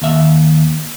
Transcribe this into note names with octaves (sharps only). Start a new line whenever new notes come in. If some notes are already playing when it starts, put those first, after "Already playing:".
D#2 E5